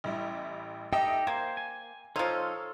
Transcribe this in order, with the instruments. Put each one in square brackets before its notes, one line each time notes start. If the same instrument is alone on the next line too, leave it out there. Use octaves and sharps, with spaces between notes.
[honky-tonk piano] A1 G3 E4
[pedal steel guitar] D#4 G4 A4 [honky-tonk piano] D#5 E5 [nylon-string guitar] G5
[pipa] A#3 [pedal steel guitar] C5 [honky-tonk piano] G#6
[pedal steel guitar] G#5
[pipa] F3 D#4 [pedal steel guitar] A4 C#5 F5 [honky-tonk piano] C6 E6 F6